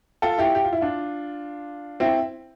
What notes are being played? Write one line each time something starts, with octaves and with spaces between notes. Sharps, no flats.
F4 A4
E4 G4
G4
F4
E4
D4 F4
C4 E4